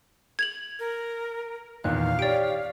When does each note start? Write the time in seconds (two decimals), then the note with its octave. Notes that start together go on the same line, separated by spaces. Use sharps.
0.39 G#6 F7 F#7
0.79 A#4
1.84 E2 A#2 D#3 F5 F#6
2.19 G4 C#5 D5 D7